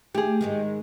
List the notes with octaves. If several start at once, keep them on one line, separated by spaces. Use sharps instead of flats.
A3 G4 G#4
G#2 D#3 G#3